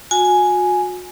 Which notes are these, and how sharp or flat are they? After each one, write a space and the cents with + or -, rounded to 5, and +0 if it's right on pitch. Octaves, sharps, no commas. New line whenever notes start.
F#4 -40 G#5 +5